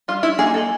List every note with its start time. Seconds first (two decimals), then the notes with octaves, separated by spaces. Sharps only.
0.08 G3 F4
0.23 E4
0.38 A#3 D#4 G#4
0.54 A4